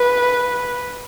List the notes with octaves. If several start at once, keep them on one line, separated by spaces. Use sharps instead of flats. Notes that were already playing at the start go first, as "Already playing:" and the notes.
Already playing: B4